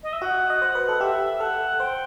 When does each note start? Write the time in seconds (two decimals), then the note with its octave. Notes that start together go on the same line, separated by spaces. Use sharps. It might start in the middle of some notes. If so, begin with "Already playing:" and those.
0.03 D#5
0.13 E5
0.21 F#4 F#5
0.50 D#5
0.62 C5
0.75 B4
0.89 A4
1.00 G4 E5
1.40 A4 F#5
1.80 C5 G5